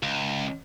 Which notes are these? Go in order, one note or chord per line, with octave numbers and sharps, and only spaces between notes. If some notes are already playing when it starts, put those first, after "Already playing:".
C#2